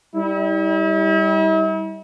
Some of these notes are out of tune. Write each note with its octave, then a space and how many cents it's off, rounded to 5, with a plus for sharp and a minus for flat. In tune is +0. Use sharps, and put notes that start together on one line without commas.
G3 +0 E4 -40